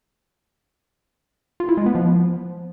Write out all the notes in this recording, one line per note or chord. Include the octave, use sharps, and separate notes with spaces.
F4
E4
G#3
B3
F3